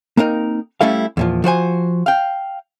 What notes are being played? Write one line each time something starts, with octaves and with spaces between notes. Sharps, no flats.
A#3 C4 D#4 A#4
G3 A3 C#4 E4 A4 F5
E2 A#2 F3
F3 F#4 C5 G#5
F5 G5